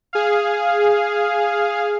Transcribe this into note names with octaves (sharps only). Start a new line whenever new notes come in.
G#4 F5